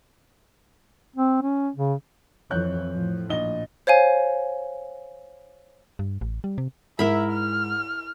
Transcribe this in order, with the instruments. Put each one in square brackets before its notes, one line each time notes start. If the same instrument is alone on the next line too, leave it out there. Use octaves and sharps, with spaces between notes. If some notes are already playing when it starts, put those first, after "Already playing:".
[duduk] C4
C#4
C#3
[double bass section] F2 E3 [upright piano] C#5 F#6 G6
[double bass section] A2 F3
[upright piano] A#1 D#5 G7
[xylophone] C5 C#5 F5 G#5
[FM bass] G2
A1
G3
C3
[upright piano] G#2 [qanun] E4 A#4 B5 [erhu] E5
[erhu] F6